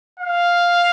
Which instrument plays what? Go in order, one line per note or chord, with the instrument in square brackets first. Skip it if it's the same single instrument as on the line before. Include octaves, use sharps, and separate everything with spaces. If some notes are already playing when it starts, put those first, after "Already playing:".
[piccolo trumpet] F5